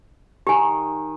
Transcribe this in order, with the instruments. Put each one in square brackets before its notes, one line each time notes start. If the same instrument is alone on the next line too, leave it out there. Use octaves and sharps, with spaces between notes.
[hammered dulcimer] D#3 [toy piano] G4 G#5